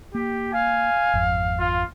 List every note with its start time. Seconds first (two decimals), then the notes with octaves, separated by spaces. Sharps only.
0.14 A#3 G4
0.53 F5 G#5
1.14 G#1 F2
1.60 F4